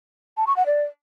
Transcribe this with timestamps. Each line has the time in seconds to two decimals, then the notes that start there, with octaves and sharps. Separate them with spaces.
0.37 A5
0.47 C#6
0.56 F#5
0.66 D5